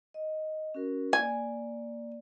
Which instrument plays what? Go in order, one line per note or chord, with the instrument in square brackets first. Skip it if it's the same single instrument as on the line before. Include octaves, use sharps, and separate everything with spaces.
[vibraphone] D#5
C#4 F#4 A#4
[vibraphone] A#3 D5 [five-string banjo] G#5